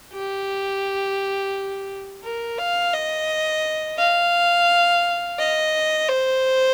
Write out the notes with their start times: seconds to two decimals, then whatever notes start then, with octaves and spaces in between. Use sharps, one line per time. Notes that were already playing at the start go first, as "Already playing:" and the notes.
0.13 G4
2.24 A#4
2.59 F5
2.94 D#5
3.98 F5
5.39 D#5
6.08 C5